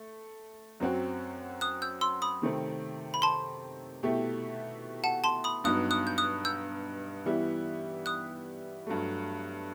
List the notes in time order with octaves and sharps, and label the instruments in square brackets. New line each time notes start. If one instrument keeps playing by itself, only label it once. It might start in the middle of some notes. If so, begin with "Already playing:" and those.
Already playing: [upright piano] A3
F#2 F#3 C4 F#4
[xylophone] D#6 F#6
E6 G6
C6 E6
B5 D#6
[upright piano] C3 D#3 A3 C4
[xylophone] B5
A5 C6
[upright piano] B2 A3 E4 G4
[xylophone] F#5 A5
A5 C6
B5 D#6
[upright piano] G2 F#3 B3 D#4 [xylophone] D#6 F#6
[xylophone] D#6 F#6
G6
D#6 F#6
E6 G6
[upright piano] E3 G3 B3 E4
[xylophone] D#6 F#6
[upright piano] G2 F#3 A3